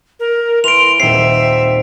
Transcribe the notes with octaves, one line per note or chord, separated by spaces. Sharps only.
A#4
E3 C6 D7 F7
D#1 C4 E5 C7 D#7